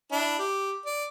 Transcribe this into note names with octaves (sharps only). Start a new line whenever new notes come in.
D4 E4
G4
D5